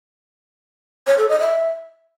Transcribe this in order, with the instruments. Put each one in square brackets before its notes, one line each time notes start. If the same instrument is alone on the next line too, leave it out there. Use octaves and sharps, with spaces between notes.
[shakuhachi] C#5
A4
D#5
E5